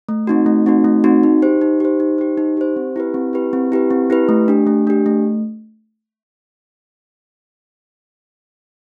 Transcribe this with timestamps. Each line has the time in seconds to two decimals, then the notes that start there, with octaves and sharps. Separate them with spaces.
0.09 A3
0.27 C4 D#4 F#4
0.46 A3
0.66 C4 D#4 F#4
0.84 A3
1.04 C4 D#4 F#4
1.23 D#4
1.42 G4 C5
1.61 D#4
1.80 G4 C5
2.00 D#4
2.18 G4 C5
2.38 D#4
2.57 G4 C5
2.76 C4
2.96 E4 G4 B4
3.14 C4
3.33 E4 G4 B4
3.53 C4
3.72 E4 G4 B4
3.90 C4
4.10 E4 G4 B4
4.29 A3
4.48 D4 G4
4.67 A3
4.87 D4 G4
5.06 A3